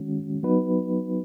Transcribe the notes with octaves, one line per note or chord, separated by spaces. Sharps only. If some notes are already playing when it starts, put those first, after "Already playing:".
Already playing: D#3 G#3 C#4 F#4
F#3 B3 D#4 F#4 B4